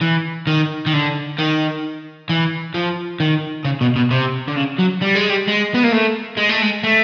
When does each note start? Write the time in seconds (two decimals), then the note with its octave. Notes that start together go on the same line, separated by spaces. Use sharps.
0.02 E3
0.47 D#3
0.87 D#3
0.94 D3
1.39 D#3
2.29 E3
2.75 F3
3.20 D#3
3.65 C#3
3.81 B2
3.96 B2
4.11 C3
4.48 D3
4.56 C#3
4.78 F#3
5.01 G3
5.15 G#3
5.30 G3
5.47 G#3
5.74 B3
5.83 A#3
5.92 A3
6.37 G#3
6.49 A3
6.62 G#3
6.83 A3